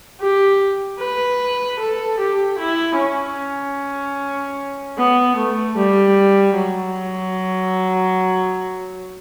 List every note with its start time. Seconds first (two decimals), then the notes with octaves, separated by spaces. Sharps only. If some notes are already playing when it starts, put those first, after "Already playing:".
0.21 G4
0.99 B4
1.79 A4
2.20 G4
2.59 E4
2.98 C#4
4.98 B3
5.36 A3
5.77 G3
6.56 F#3